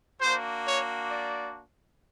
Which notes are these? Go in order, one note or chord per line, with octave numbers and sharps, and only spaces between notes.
A#3 D4 F#4 C5
C#5
D5